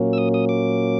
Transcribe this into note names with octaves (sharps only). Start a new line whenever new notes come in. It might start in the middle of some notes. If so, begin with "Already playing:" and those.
Already playing: A#2 F#3 A#3 C#4
E6
D#6
D#6
D6